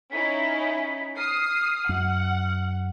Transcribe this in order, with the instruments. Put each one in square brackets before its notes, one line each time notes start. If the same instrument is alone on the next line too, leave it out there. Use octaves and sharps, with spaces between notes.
[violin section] C#4 D#4 E4 [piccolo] B6
[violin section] D#6 C7 [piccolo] F6
[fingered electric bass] F#2 [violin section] F#5